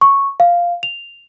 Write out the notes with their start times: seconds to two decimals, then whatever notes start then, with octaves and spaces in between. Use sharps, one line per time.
0.01 C#6
0.40 F5
0.83 F7